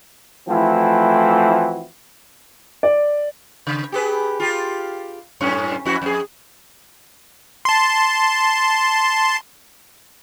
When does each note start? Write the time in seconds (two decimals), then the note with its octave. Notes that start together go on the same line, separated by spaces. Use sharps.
0.48 E3 F3 A3 C4 E4 F#4
2.83 D5
3.67 C#3
3.92 G4 G#4 B4
4.40 F4 G4
5.41 F#2 A2 C#4
5.85 F2 E4 F#4
6.02 F2 G#4
7.65 A5 C6